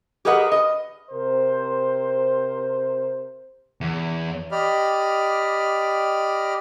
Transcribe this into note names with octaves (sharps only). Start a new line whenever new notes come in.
G4 G#4 A#4 B4 D#5 F#5
D#5
C3 A#4 C5
E2
G4 D5 D#5 B5 F6